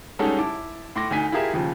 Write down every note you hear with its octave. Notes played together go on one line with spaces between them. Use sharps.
G3 G#3 C#4 D#4 A4 F#5
E4 A5 D6
A2 C6 D6 A#6
D2 D#4 G#5 B6
E4 F4 G4 G#4 A#4 E5
D#2 C#3 F3